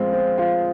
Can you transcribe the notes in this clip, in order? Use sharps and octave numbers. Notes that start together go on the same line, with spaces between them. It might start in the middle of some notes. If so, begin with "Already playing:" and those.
Already playing: F3 G#3 C4 F4
C4
F4